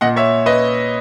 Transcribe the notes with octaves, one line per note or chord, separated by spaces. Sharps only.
A#2 D#5 F#5
C#5 E5
B4 D#5